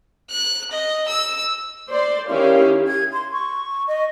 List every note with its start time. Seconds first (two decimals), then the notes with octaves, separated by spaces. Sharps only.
0.30 F#6
0.71 D#5
1.08 E6
1.88 C5 D5 C6
2.29 D#3 C#4 E4 G4 F5
2.86 G#6
3.12 C6
3.32 C#6
3.87 D#5